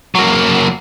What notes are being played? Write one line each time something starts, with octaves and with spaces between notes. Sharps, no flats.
F#3 A#3